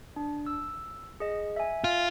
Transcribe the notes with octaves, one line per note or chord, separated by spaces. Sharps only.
D4
E6
G#4 D#5
E5 G#5
F4